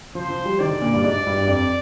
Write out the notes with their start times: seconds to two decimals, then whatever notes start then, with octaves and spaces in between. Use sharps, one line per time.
0.15 F3 C5
0.31 F3
0.45 G3
0.60 D#3 D5
0.71 D3
0.82 A#2
0.93 G2
1.04 G#2 D5
1.27 G2
1.38 G2
1.48 F2 D5